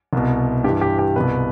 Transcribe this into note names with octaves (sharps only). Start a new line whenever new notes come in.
C2 B2
G2 G4
E3
G4
G4
C2 B2 B4